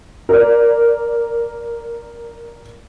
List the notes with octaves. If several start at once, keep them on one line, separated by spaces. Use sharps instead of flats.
A#4 D5